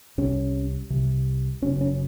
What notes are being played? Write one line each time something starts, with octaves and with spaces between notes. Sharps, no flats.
C2 C3 C#4
C2 C3
F#1 F#2 C#3 C#4
C#4